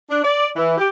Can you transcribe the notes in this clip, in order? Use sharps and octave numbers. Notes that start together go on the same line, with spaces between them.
D4
D5
E3
G4